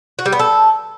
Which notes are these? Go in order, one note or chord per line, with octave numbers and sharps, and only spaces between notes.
F#4
G3
B3
A4